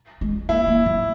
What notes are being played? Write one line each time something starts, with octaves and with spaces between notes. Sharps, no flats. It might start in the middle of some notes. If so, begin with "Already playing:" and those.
G#3
A#3 E4
A#3
F#3